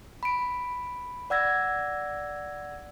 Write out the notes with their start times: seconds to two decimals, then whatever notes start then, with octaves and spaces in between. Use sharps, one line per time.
0.23 B5 D7
1.30 D5 F#5 E6 G#6 A#6